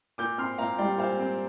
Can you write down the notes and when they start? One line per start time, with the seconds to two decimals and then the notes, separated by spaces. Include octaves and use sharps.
0.18 A#2 D6 G6
0.38 C4 C6 F6
0.58 A#2 F5 A#5
0.78 G3 D5 G5
0.98 A#2 C5 F5
1.19 C4